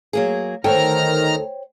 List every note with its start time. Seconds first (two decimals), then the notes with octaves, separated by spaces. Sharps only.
0.13 F#3 A#3 G#4
0.64 D2 D#3 A4 C5 C#5 G5 A#5 F6